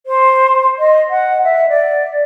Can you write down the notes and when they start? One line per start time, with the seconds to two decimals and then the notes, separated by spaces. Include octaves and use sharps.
0.06 C5
0.78 D#5
1.10 F#5
1.44 E5
1.69 D5